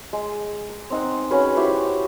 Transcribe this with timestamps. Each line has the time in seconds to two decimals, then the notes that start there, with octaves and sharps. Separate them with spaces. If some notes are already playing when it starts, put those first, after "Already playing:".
0.13 G#3
0.69 A#5
0.90 C4 D#4 F#5
1.31 C#4 F#4 G#4 B4
1.56 E4 F#4 G4 C5